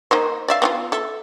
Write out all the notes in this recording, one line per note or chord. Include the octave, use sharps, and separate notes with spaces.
A#3 D#4 C5
D5 E5 F5
B3 D#4 F4
A4 E5